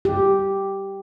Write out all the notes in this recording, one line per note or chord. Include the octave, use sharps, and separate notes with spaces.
G4